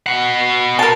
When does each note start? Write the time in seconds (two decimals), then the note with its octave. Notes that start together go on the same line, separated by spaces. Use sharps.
0.06 B2 F#5
0.79 A#4 A5